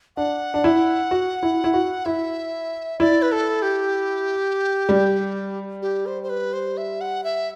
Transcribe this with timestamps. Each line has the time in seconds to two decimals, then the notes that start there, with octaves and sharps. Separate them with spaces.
0.16 D4 F#5
0.54 D4
0.64 E4
1.11 F#4
1.43 E4
1.64 E4
1.74 F#4
2.05 E4 E5
3.00 E4 D5
3.22 B4
3.32 A4
3.62 G4
4.89 G3
5.82 G4
6.06 C5
6.23 C5
6.29 B4
6.53 C5
6.77 E5
7.01 F#5
7.24 E5